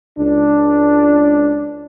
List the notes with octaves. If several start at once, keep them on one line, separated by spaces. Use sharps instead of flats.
C#2 D4